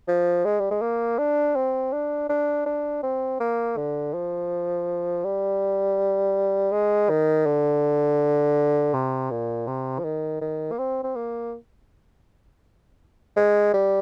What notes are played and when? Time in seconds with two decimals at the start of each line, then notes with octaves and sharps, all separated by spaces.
0.08 F3
0.45 G#3
0.60 G3
0.71 G#3
0.81 A#3
1.18 D4
1.55 C4
1.92 D4
2.29 D4
2.66 D4
3.03 C4
3.40 A#3
3.77 D3
4.14 F3
5.24 G3
6.72 G#3
7.09 D#3
7.46 D3
8.94 C3
9.31 A#2
9.67 C3
9.99 F3
10.04 D#3
10.41 D#3
10.72 A#3
10.78 C4
11.03 C4
11.16 A#3
13.36 G#3
13.74 G3